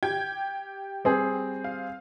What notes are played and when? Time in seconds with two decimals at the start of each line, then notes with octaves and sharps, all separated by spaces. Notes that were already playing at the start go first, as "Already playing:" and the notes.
0.03 G4 G5 G#6
1.04 G3 C4 G#4
1.64 F5